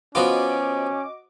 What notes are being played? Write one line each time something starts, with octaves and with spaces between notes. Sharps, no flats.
F3 B3 C#4 F4 F#4 D#5 D6